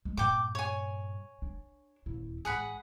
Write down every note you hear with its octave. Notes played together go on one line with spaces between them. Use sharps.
G#3
G2 A#2 G5 D6
C#5 G#5
D4
D#1 E4
A1 G#3 G#4 F#5 B5